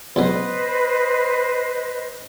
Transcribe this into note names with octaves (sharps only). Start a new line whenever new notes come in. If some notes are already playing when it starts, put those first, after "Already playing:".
C#2 B2 F#3 B4 C5 D#5